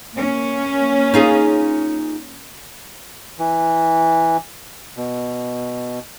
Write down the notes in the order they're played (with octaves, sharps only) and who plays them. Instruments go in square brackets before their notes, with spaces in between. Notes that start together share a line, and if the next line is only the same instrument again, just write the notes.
[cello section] A#3 C#4
[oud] D#4 F4 G#4
[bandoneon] E3
B2